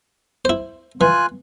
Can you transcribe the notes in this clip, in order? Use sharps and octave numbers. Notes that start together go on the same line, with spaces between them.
E4 C5
E3 F4 G#5 F#6